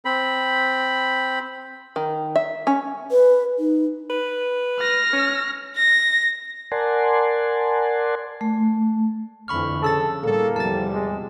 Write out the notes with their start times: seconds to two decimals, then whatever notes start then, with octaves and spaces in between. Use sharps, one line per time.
0.05 C4 B5
1.96 D#3
2.36 E5
2.67 C#4
3.11 B4
3.59 D#4
4.10 B4
4.81 F6 A#6
5.13 C#4
5.76 A#6
6.72 A#4 D5 F#5 G#5 A5 C6
8.41 A3
9.48 F2 D3 E3 B5 C#6 F6
9.82 C#3 G#4 A4 E6 A6
10.23 A2 D3 G3 A#3 A4
10.56 E2 C3 F3 G3 A5 A6
10.93 G#3